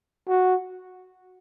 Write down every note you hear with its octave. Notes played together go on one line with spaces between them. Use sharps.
F#4